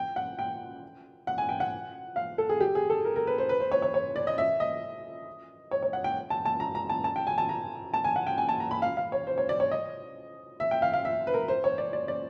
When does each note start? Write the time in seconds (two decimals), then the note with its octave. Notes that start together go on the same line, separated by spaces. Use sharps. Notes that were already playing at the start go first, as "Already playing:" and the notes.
Already playing: G5
0.16 F#5
0.39 G5
1.27 F#5
1.38 G#5
1.49 G5
1.60 F#5
2.16 F5
2.38 A4
2.49 G#4
2.60 G4
2.75 G#4
2.90 A4
3.05 A#4
3.16 A#4
3.27 B4
3.38 C5
3.49 B4
3.60 C5
3.72 C#5
3.82 C#5
3.94 C#5
4.16 D5
4.27 D#5
4.38 E5
4.60 D#5
5.71 C#5
5.83 C#5
5.93 F#5
6.04 G5
6.30 A5
6.45 A5
6.60 A#5
6.75 A#5
6.89 A5
7.04 A5
7.16 G5
7.27 G#5
7.38 A5
7.49 A#5
7.94 A5
8.04 G#5
8.16 F#5
8.27 G5
8.38 G#5
8.49 A5
8.60 A#5
8.71 B5
8.82 F5
8.97 F5
9.12 C#5
9.27 C5
9.38 C#5
9.49 D5
9.60 C#5
9.71 D#5
10.60 E5
10.71 G5
10.82 F5
10.93 F5
11.05 E5
11.27 B4
11.34 A#4
11.48 C5
11.64 C#5
11.78 D5
11.93 D5
12.08 D5